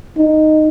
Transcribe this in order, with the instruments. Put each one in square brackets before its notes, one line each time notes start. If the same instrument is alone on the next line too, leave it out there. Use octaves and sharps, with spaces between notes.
[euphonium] D#4